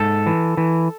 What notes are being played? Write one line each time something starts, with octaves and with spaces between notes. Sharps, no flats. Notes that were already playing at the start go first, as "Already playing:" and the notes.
Already playing: G#2 A4
E3
E3